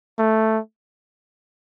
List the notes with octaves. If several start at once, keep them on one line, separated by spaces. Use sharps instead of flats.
A3